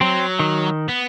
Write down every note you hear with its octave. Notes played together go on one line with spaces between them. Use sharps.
F#3 C4
D#3
B3